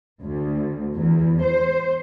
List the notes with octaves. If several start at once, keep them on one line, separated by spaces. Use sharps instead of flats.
D2
E2
C5